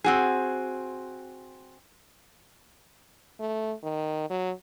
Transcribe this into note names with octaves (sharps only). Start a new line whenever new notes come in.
C4 F#4 G#4
A3
D#3
F#3